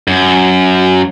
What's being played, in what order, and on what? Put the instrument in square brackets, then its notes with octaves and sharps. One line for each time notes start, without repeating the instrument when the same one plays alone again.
[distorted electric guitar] F#2